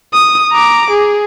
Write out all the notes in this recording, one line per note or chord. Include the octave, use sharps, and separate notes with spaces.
D#6
A#5 D6
G#4